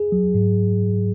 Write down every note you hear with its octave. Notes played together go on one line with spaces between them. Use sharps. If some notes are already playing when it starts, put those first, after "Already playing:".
Already playing: G#4
F#3
G#2